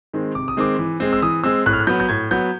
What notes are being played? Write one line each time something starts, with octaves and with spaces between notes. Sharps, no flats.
D#3 G#3 C4
C3 D6
D#6
D#3 G#3 C4 D6
E3
G#3 C4
E6
E3 D#6
G#3 C4 E6
A2 F#6
F6
F#6
F#3 B3 G6
G6
A2 G#6
F#3 B3 G6